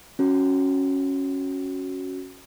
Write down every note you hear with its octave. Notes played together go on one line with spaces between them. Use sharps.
C#4 F#4